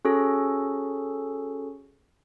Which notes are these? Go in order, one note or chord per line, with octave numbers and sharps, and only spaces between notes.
C#4 F#4 G#4 A4